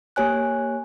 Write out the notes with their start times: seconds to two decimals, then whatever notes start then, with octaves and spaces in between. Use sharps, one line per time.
0.16 A#3 G4 C#5 G#5 F#6